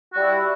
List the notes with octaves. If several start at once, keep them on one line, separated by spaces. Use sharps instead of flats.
G3 E4 F#4